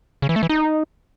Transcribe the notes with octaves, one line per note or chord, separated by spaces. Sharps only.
C#3
E3
A3
E3
D#4